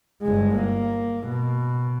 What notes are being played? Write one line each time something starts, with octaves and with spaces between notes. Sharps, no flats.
G1 G#3
A#3
B2